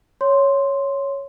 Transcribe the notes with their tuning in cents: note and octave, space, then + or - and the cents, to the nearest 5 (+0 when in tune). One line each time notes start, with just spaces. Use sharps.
C#5 +0 C6 +0